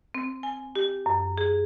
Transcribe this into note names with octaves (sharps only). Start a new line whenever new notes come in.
C4
G#5
G4
F#2
G#4